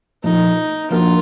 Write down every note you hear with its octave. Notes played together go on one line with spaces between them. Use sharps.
A#2 F3 A3 D#4
F3 A#3 D4 F4 F#4 A#4